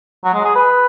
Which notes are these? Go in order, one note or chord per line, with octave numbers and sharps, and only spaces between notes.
F#3
G#3
G#4
B4